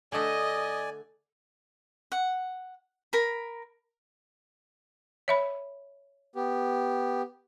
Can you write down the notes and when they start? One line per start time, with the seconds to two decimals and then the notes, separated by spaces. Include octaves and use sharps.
0.12 D3 A3 D5 D#5 G#5
2.12 F#5
3.13 A#4 B5
5.28 C#5 E5 B5
6.36 B3 G4